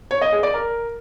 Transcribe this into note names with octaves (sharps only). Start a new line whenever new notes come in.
C#5
D#5
G#4
D5
A#4